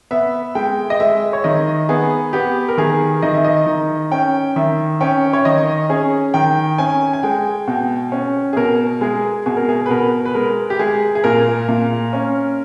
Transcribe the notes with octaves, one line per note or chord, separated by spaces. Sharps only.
B3 E5
G#3 G5
D#5
G#3 E5
C#5
D#3 D#5
B3 G#4
B3 G4
A#4
D#3 G#4
D#3 D#5
E5
D#5
D#3
C#4 G5
D#3 E5
C#4 G5
C#5
D#3 D#5
C#4 G#4
D#3 G5
C#4 G#5
G#5
G#3 G5
B2 G5
C#4
G#4
B2 A#4
G#3 G#4
B2 G#4
A#4
G#4
B4
B2 A#4
B4
G#3 A#4
G4
G#3 G#4
G#4
A#2 A#4
A#2
C#4